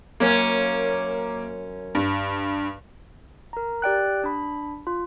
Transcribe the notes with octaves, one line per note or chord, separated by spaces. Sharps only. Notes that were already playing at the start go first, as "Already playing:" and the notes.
F#2 A#3 C#4
G2
A#4 A#5
G4 D5 G5 F#6
D4 B5
F4